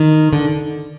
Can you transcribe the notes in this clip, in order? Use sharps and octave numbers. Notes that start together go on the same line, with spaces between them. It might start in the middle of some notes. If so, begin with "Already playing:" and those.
Already playing: D#3
D3